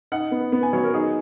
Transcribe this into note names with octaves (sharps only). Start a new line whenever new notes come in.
D#4 F#5
B3
B3
G#5
F#3 C#5
A#4
D#4 G#4